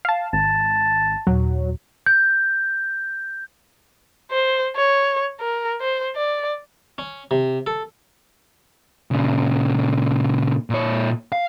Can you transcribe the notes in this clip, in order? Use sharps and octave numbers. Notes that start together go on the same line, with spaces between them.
F5 A5
G#1 A5
D#2 A#2 F#3
G6
C5
C#5
A#4
C5
D5
C#4
C3
A4
A#2 C#3
A#2 C#5
F5